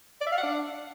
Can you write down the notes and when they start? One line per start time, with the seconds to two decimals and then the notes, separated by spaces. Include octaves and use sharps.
0.21 D5
0.26 E5
0.32 F5
0.38 F#5
0.43 D4